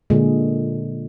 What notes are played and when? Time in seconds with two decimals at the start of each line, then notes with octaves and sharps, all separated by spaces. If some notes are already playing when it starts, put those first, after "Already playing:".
0.10 A#2 D3 G#3